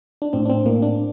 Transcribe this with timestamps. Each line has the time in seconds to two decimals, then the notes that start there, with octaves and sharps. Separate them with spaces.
0.22 D4
0.33 A2 C4
0.45 D4
0.50 C4
0.65 A2 A#3
0.82 D4